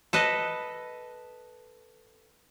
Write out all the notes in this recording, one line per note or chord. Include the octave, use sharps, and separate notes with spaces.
A4 B4 D#5